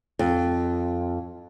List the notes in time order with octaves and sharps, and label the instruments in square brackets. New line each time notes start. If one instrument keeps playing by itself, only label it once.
[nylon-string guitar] F2